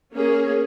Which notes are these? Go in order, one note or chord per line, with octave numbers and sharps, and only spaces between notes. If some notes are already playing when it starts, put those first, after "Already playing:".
A#3 C#4 G#4